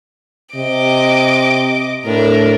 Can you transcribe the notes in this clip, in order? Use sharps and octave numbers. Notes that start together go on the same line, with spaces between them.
C3 D#5 D6
A2 D4 A#4